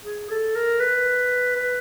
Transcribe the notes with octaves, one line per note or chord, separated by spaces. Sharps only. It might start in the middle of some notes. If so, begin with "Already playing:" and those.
G#4
A4
A#4
B4
B4